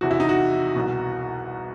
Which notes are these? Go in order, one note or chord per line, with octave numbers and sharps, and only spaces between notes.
E2 C3 E3 F#4
E4
D#4
F#4
C2 B2